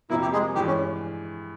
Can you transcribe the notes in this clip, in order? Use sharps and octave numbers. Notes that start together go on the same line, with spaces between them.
F2 C3 F3 A#3 E4
G4
G#3 G#4
G2 E3 G#3 G4
C#4